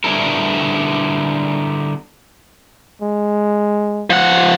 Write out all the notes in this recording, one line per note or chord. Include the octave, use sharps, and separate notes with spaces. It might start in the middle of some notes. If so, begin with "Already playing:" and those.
D3 G3 B3 E4 A4 A#4
G#3
F3 F#5